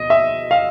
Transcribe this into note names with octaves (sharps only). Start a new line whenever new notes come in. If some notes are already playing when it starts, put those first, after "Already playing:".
Already playing: B2 D#5
E5
F5